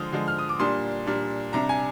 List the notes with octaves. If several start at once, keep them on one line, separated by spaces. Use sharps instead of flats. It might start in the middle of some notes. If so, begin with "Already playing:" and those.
Already playing: D3 F3 G#3 D#6 F6
D3 F3 G#3
F6
D#6
D6
A#2 G3 D4 C6
A#2 G3 D4
C3 G3 D4 A#5
G#5